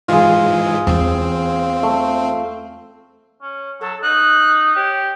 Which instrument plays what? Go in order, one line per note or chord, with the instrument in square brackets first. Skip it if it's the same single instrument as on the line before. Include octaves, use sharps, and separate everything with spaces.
[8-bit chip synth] G#2 E3 G#3 [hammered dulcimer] F4 G#4
[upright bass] E2 E3 [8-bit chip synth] C4
[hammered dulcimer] A3
[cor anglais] C#4
[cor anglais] F#3 [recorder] A4
[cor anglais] D#4 [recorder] F#6
[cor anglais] G4 [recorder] C#5